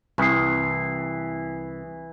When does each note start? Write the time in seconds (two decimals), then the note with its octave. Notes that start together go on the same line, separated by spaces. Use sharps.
0.18 C2 E3 C#6 D#6 C7